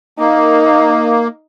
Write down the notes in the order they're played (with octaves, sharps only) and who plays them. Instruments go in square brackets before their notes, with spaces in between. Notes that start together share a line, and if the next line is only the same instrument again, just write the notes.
[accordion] A#3 [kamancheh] D#4